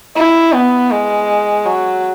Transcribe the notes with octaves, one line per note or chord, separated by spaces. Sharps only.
E4
B3
G#3
F#3